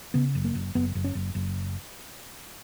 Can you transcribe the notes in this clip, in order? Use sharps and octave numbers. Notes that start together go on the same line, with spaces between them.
C#3 B3
F#1
A#3
F#1
F#1 B3
F#1
C#4
F#1
F#1